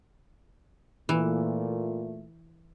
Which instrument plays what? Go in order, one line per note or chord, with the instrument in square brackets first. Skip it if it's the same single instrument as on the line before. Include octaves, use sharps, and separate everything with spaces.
[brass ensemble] A#2 A3 [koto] E3